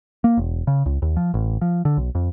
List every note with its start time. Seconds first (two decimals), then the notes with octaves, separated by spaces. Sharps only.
0.24 A#3
0.37 E1
0.67 C#3
0.86 C#2
1.02 D#2
1.17 F3
1.34 A1
1.61 F3
1.85 D3
1.97 B1
2.15 F2